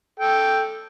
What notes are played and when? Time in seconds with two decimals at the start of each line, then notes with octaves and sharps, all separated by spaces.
0.20 A4 G5